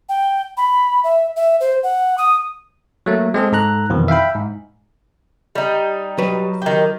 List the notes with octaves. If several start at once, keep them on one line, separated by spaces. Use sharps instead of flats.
G5
B5
E5
E5
C5
F#5
D#6
F#3 A3 A#3
G#3 C4 G#4 A4
G#2 A4 A#5 F#6
F2 B2 D#3 E3
E5 F5 G5 B5
G#2
G3 D#4
F#3 B4
D#3 G4